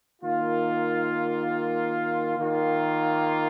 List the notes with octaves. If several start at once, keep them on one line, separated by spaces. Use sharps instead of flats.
D#3 A#3 F4
D#3 A#3 F4